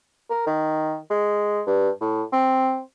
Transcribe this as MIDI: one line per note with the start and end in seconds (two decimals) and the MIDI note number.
0.30 0.44 70
0.47 0.97 51
1.10 1.62 56
1.67 1.89 43
2.01 2.23 45
2.32 2.80 60